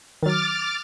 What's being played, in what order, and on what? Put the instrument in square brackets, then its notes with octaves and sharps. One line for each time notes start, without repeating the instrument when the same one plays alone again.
[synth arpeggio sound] D#3 F#3 [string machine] D6 F6 A6